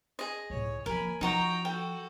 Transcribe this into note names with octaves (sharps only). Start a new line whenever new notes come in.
G#4 D#5
C#2 A2 C#5
F3 A#3 A#4 G#5 B5
F3 D#4 F#4 G5 A#5 C#6
F#4 A4 G5